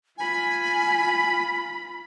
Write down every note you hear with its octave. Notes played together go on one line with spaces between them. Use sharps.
F4 G#5 B5